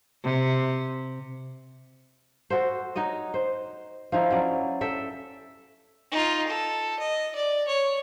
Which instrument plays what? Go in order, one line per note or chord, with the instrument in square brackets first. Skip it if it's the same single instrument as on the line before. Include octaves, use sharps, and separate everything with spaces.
[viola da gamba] C3
[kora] F#4 A4 C5
D#4 F#4 C#5 D#5
C5
F3 D#4 E4
F#3 C#4 D5
A4 E5 G5
[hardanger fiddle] D#4 F4
A4
D#5
D5
C#5